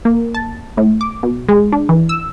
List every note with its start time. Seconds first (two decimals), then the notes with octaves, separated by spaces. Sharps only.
0.05 A#3
0.35 A5
0.77 A2
1.01 D6
1.23 B2
1.49 G#3
1.72 D4
1.89 E3
2.09 E6